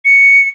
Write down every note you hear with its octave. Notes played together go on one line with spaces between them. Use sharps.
C#7